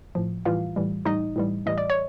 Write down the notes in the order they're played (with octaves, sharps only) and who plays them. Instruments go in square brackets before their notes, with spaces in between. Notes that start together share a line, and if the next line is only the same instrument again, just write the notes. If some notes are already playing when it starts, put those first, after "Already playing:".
[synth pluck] A2 F3
A2 E3 G3 F4 F5
A2 E3 G3
A2 E3 G3 D#4 D#5
A2 E3 G3
A2 E3 G3 D#5
D5
C#5